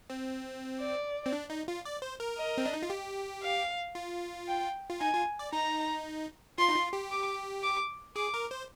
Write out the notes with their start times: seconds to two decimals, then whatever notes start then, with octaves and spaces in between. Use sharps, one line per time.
0.10 C4
0.80 D5
1.26 C4
1.33 D4
1.50 D#4
1.68 F4
1.85 D5
2.02 C5
2.20 A#4
2.37 D#5
2.58 C4
2.66 D4
2.74 D#4
2.83 F4
2.90 G4
3.43 F5
3.95 F4
4.48 G5
4.89 F4
5.01 D#4 G#5
5.14 F4
5.39 D5
5.53 D#4 A#5
6.58 F4 C6
6.69 D#4
6.76 F4
6.93 G4
7.11 D6
7.63 D6
8.16 G#4 D6
8.34 A#4
8.51 C5